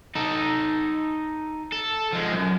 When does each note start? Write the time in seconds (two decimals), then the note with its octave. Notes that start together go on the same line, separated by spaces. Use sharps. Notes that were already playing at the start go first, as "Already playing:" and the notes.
0.15 D#4 A4
1.72 A4
2.13 F3 G#3
2.33 F#2